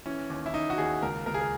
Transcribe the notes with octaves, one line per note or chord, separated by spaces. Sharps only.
E3 C#4
D#2
E4
D#2 D#4
F#4
D#2 G#4
C#2 A#4
C#2 A#4
G#4
A#4